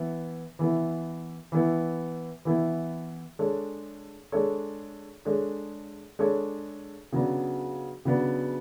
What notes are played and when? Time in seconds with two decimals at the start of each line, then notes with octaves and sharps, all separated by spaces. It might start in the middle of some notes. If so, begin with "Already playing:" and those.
Already playing: E3 B3 E4
0.59 E3 B3 E4
1.52 E3 B3 E4
2.45 E3 B3 E4
3.39 G#3 D4 A4 C#5
4.32 G#3 D4 A4 C#5
5.25 G#3 D4 A4 C#5
6.19 G#3 D4 A4 C#5
7.12 C#3 F#3 B3 D4
8.05 C#3 F#3 B3 D4